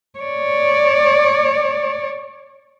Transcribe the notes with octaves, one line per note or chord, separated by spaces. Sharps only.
C#5 D5